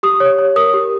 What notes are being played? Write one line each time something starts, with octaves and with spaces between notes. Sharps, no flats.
G4 D#6
C#5
C#5
A#4 D#6
G4